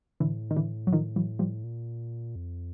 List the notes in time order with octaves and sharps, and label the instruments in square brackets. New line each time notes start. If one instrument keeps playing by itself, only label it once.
[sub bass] A2 [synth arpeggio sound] D3 E3
[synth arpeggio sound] D#3
D3 E3
F#3
D#3 F3
E3 F#3
F3 G3
[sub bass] A#2
F2